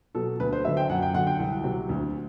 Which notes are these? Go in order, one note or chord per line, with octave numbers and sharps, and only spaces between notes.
B2 F#3 A4
D2 B4
C5
D3 F#3 E5
G5
F#2 F#5
G5
D3 F#3 F#5
G5
C2
C3 F#3
D2